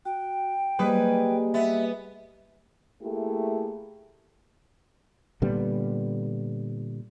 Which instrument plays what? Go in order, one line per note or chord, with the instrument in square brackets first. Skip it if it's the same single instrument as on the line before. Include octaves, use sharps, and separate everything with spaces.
[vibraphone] F#4 [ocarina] G5
[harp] G3 G#4 [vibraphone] A#3 G4 D#5 [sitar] B4
[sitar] B3 [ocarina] E5
[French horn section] A3 A#3 E4 G4 G#4
[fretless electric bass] A#2 D3 G3 B3